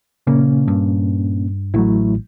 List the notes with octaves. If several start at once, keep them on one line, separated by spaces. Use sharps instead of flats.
A#2 C#3 A#3 C#4
G2
A1 F#3 A3 E4